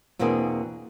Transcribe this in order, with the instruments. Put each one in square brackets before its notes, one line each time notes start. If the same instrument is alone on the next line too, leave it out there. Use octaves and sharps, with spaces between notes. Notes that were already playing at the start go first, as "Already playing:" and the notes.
[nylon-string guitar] E2 B2 A#3 C4 D4 G#4